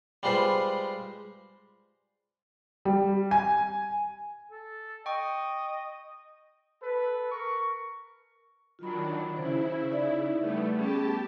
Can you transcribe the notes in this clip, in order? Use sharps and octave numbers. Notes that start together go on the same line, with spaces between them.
G3 G#3 F4 B4 C5
G3
G#5
A4
D#5 G5 C#6
A4 B4
A#4 C#6
D#3 F#3 D4 F4 B5
C#3 E4 C5
D#4 D5 E5
G3 A3 B3
B3 C#4 G4 G#4 A5